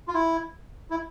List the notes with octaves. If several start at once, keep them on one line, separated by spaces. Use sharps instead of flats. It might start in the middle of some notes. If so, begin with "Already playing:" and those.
F4
E4
E4